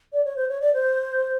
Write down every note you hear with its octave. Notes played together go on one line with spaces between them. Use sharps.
D5
C#5
C5
C#5
D5
C5